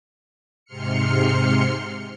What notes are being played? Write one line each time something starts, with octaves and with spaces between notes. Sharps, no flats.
G#2 C3 C6 F6 C#7